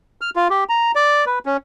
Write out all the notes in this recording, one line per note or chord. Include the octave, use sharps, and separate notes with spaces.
F6
F4
G4
A#5
D5
B4
C#4